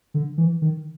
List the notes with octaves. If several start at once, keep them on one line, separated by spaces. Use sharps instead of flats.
D3
E3
D#3